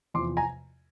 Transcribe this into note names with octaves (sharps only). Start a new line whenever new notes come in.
E2 C3 F3 C6 D6
G#5 A#5